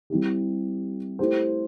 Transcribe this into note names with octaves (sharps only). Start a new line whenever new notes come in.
G3 C4 E4 G4
A3 E4 G4 C5